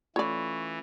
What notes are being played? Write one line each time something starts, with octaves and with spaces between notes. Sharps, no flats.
E3 A3 C#4 F4 C#5 D5 B5 C#6